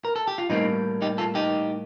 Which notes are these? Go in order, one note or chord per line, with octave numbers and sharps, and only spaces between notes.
A#4
A4
G4
F4
A2 G3 A#3 C4 D#4
D#4 G4
F4 A4
D#4 G4